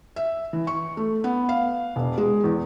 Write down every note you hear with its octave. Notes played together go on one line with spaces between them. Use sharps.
E5
E3
C#6
A3
B3
F5
E1
G#3
E2